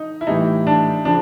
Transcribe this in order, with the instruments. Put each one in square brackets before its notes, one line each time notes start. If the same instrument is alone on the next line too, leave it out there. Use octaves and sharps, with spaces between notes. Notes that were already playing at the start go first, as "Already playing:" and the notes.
Already playing: [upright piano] D#4
E4
[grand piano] A2 E3 G3 [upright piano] D#4
[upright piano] D4
[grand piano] C#3 F3 [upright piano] D4